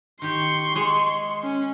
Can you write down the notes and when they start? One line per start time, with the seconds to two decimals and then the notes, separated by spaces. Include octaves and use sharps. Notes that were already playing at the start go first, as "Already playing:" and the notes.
0.22 D#3 G4 C6 C#6
0.75 G#3 G#4
1.43 C#4